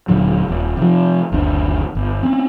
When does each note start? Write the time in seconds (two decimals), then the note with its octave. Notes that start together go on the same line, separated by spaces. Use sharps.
0.08 D1 A#2 D3 F#3
0.48 D#1
0.77 C3 F3
1.32 F#1 D2 D4
1.95 G1
2.23 C4 C#4